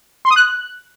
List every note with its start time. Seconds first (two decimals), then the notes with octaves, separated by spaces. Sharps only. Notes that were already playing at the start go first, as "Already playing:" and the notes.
0.25 C6
0.31 D#6
0.36 F#6